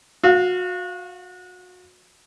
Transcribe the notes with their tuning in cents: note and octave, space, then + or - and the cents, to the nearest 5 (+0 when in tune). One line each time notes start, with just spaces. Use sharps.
F#4 -30 F5 +0